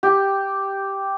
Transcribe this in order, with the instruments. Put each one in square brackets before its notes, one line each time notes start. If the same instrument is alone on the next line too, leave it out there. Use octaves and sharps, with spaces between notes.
[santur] G4